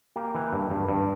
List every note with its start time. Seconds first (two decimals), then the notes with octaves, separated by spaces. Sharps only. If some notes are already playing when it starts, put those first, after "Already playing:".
0.16 A#3 G4
0.35 E3
0.53 G2
0.70 G2
0.88 G2